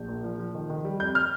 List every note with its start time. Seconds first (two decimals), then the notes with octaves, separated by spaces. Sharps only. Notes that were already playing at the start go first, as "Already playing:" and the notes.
Already playing: A#1 G6
0.09 A#2
0.24 F3
0.39 F3
0.55 D#3
0.70 D#3
0.85 G3
1.00 F2 G6
1.15 F6